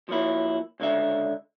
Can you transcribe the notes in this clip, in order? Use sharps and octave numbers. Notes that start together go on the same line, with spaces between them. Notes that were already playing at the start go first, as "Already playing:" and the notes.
F3 F#3 A#3 E4
C#2 D3 E5